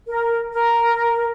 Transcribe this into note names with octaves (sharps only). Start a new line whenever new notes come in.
A#4
A#4